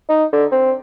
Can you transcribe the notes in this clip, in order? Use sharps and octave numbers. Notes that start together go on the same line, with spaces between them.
D#4
D3
C4